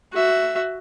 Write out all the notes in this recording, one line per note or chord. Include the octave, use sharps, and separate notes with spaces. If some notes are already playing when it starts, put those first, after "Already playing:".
F#4 E5